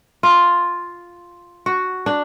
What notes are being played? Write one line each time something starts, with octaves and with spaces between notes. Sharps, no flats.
F4
F#4
D4